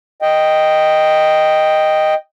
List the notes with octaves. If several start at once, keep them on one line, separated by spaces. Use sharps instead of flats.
D#5 G5